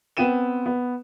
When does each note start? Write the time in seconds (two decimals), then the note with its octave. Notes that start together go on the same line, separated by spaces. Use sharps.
0.17 B3 C4 G5 D#7 E7
0.66 B3